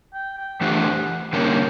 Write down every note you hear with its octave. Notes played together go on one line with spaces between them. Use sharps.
G5
G5
E3 A3 D4 G4 C5 F#5
D3 G3 A#3 C#4 G5